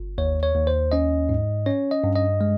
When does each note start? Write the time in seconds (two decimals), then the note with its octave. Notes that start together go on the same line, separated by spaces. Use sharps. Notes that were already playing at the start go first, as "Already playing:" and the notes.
Already playing: G1
0.18 D#2 C#5
0.43 C#5
0.55 D#2
0.67 C5
0.92 C#4 D#5
1.29 G#2
1.66 C#4 C#5
1.91 D#5
2.04 G2
2.16 D#5
2.41 G#3